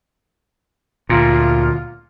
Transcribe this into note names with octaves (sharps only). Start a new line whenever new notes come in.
D2 A#2 F4